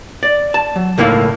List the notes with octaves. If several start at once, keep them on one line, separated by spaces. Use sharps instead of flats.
D5
A5
F#3
C#2 A2 A#3 E4 F5